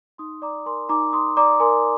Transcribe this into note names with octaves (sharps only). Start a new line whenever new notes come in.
D#4 C6 D#6
D5 A#5 D6
A#4 G#5 C6
D#4 A#5 D6
D#4 C6 D#6
D5 A#5 D6
A#4 G#5 C6